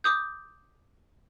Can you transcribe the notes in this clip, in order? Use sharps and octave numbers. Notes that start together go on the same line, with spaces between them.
D6 D#6 G6